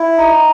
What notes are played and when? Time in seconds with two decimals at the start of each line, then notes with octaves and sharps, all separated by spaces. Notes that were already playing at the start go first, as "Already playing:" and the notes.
Already playing: E4
0.17 D#4